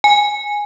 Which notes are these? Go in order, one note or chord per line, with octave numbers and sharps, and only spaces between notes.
G#5